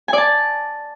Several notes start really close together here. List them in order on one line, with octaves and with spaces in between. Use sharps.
G#5 D5 A5